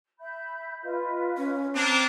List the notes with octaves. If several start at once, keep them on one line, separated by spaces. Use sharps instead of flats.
E5 B5 G6
F4 B4 D#5
C#4
A#3 C4 D4 A5 A#5